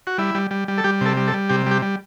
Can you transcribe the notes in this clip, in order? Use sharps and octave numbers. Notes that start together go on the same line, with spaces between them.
F#4
G3 E4
G3
G3
G3
A4
G3 G4
C3 A4
G3
A4
G3
C3 G4
G3 G4
G3